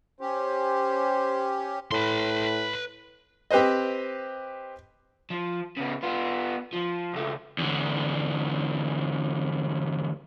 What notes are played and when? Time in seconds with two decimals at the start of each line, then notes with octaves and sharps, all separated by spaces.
0.21 C#4 G4 C5
1.92 A2 B4 C6
3.51 C4 G4 B4 C5 D#5
5.30 F3
5.77 C#3 B3
6.03 B3 F4
6.73 F3
7.14 C#2 A3
7.58 E2 D3